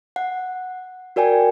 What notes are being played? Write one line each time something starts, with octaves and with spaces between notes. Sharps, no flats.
F#5
F#4 A#4 D5 G5 G#5